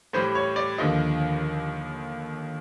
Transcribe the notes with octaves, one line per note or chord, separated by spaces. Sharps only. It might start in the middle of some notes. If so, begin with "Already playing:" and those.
A2 E3 G3 C5
C#5
D5
D#2 D3 F3 D#5